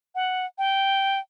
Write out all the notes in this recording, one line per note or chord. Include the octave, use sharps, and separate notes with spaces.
F#5
G5